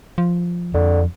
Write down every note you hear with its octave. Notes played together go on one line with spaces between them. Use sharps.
F3
F2 D3